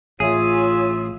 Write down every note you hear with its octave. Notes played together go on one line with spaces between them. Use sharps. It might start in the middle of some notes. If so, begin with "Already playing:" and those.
A1 F4 G#4 C#5 E5